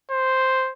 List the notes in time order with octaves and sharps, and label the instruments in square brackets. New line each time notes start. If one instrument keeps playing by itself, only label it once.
[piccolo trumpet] C5